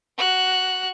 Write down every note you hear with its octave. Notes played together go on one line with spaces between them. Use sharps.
F#4 F#6